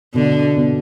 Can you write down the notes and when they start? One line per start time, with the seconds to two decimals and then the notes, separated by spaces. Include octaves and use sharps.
0.14 B2 D3
0.57 B2